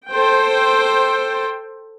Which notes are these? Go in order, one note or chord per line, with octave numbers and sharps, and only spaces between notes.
A4 C5 G5